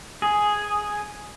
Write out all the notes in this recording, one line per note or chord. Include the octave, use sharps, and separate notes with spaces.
G#4